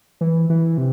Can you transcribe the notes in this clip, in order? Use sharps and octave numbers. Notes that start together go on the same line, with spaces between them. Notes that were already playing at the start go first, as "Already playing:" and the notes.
E3
E3
C3